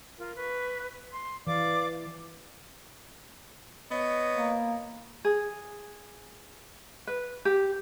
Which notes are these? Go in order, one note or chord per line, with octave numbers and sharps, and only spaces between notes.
F4 A#4
B4 C#6
C6
E3 D5 F5 D6
B3 C#5 D#5
A#3
G#4
B4
G4